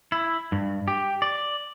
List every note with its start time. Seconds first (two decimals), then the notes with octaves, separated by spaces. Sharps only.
0.12 E4
0.52 G2
0.88 G4
1.22 D5